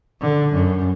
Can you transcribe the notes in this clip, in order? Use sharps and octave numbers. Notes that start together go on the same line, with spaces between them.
D3
F#2